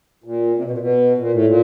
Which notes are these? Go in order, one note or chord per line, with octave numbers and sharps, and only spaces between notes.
A#2
C3
B2
A#2
B2
A#2
A2
A#2